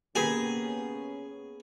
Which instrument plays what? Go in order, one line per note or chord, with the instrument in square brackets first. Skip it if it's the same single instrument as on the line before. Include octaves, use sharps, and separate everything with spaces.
[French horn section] C#3 B3 C#4 [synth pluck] A#3 [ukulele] G4 A#4 B4 [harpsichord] G#4